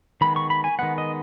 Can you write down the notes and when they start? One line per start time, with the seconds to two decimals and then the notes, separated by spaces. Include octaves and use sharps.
0.21 D#3 G#3 B3 B5
0.36 C#6
0.50 B5
0.64 G#5
0.79 D#3 G#3 B3 F#5
0.98 D#5